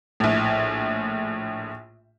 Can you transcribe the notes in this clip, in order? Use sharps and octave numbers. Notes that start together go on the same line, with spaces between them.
A#1 A2